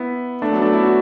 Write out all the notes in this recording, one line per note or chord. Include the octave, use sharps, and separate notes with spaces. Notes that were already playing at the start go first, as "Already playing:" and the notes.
Already playing: B3 E4
A3 D4
F#3 B3
A3 D4
B3 E4
D4 F#4